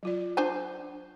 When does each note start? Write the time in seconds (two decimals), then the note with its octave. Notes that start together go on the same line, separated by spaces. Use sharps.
0.03 F#3 F4 D5
0.37 D4 C5 G#5